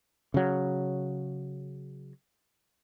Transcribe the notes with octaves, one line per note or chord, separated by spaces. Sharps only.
C#3 F#3